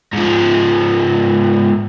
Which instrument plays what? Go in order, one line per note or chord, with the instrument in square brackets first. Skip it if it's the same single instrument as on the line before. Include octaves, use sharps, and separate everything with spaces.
[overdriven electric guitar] G#2 F3